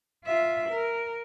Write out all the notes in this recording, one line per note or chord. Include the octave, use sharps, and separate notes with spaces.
F4 E5
A#4